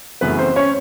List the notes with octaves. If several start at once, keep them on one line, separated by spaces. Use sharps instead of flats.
F#2 C#3 E3 A3 B3 B4
C4 C5
C#4 C#5